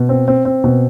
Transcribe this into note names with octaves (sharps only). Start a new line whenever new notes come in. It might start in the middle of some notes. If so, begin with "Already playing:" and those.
Already playing: B2
C4
C4
C4
B2